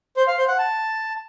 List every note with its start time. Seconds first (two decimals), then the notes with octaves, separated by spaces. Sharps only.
0.17 C5
0.27 F5
0.38 C5
0.48 F#5
0.59 A5